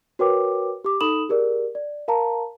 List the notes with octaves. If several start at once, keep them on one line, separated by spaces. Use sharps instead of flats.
F#4 A#4 B4 C#5 G5 D6
G4 D6
D#4 A4 B5 D#6 E7 F#7
G4 G#4 A#4 D5
D5
A#4 F5 A5 A#5